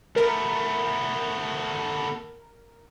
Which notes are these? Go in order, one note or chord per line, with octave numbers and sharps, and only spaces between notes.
A3 B3 A#4